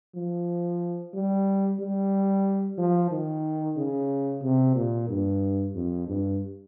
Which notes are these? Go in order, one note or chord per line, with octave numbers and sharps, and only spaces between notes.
F3
G3
G3
F3
D#3
C#3
C3
A#2
G2
F2
G2